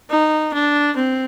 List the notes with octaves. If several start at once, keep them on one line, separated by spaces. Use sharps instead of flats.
D#4
D4
C4